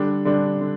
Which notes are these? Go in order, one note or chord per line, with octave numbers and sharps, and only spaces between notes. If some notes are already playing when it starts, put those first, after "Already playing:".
Already playing: D3 G3 D4
D3 G3 D4
D3